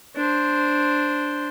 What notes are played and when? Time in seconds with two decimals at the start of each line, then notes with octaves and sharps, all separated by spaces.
0.16 D4 C5